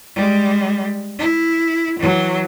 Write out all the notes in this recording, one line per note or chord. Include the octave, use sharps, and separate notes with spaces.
G3 G#3
E4
E3 F#3